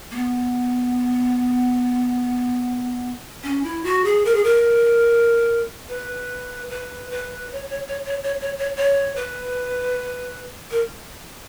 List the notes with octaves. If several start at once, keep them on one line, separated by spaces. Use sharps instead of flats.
A#3
B3
C#4
E4
F#4
G#4
A#4
G#4
A#4
B4
B4
B4
C#5
C#5
C#5
C#5
C#5
C#5
C#5
C#5
B4
A#4